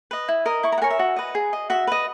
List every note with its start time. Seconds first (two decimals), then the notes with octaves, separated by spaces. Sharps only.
0.11 B4 D#5
0.28 E4
0.46 A#4 D#5
0.63 E4 C#6
0.72 A#5
0.78 F#5
0.82 A#4 C#5 G#5
0.90 E5
0.99 F#4
1.16 B4 D#5
1.35 G#4
1.53 D#5
1.70 F#4 E5
1.87 B4 D#5